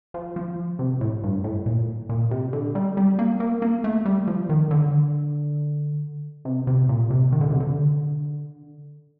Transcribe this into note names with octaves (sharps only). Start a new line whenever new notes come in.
F3
F3
C3
A2
G2
A2
A#2
A#2
C3
D3
G3
G3
A#3
A#3
A#3
A3
G3
F3
D#3
D3
C3
C3
A#2
C3
D#3
D3
C3
D3